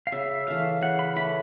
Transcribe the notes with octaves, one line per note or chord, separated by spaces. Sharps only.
F5
C#3 E5
E3 A3 F5
C#3 F#5
B5
E3 A3 B5